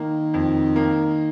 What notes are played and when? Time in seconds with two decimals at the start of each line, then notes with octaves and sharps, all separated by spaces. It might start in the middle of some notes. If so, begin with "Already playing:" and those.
Already playing: D#3 A#3
0.34 F2
0.76 A#3